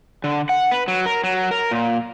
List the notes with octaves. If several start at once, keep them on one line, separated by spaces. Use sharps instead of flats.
D3
F#5
B4
F#3
A#4
F#3
A#4
A#2